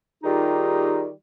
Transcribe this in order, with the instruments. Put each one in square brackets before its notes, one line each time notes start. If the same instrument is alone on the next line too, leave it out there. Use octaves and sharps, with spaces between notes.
[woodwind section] D#3 G3 D#4 F4 G4 G#4